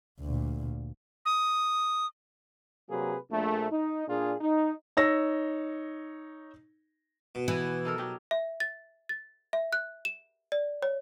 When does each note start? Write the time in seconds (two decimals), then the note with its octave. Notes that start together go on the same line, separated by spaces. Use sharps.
0.20 D2 A#2
1.26 D#6
2.89 C3 F#3 A#3 G#4 B4
3.31 A#1 A3
3.71 D#4
4.08 A#2 D4 F4 G#4
4.40 D#4
4.97 D#4 C#5 E6 A#6
7.35 B2
7.48 E3 B3
7.85 D#4 A4 A#4
7.98 F#3 D#4 G4
8.31 E5
8.60 A6
9.09 A6
9.53 E5
9.73 F#6
10.05 E7
10.52 D5
10.82 C#5